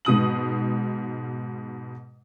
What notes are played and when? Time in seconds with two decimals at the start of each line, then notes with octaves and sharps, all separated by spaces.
0.05 G#2 B2 D#6 F#7